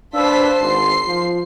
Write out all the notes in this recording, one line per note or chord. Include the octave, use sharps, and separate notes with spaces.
D4 B4 C5 F5 A5 E6 B6
G#1 C6 C7
F3